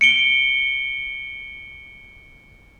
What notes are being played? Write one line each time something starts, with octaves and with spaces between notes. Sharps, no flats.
C#7 D7 G7